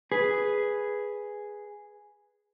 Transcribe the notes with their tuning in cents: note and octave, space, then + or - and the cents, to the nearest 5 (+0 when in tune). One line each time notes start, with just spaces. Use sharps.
G#4 +0 B4 +0